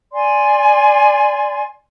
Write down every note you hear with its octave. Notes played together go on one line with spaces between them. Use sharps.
D5 G#5 C6